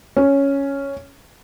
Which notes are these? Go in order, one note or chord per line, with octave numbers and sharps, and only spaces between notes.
C#4